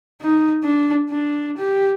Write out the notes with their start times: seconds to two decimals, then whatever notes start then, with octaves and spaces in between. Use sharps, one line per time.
0.21 D#4
0.63 D4
1.10 D4
1.57 G4